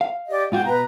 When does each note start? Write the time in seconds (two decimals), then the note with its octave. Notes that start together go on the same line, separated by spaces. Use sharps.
0.01 F5
0.29 G4 D5 D#5
0.52 G#2 F4 F#4 G5
0.65 B2 B4 A#5